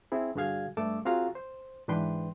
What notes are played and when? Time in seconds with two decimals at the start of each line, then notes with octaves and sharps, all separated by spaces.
0.12 C4 E4 G#4
0.35 G2 D3 F#4 G#4 F5 G#6
0.77 G2 A3 A4 D6 E6
1.05 C4 F4 F#4 G#4 F5 A#5
1.35 C5
1.88 G#2 E3 D4 B4 G5 C6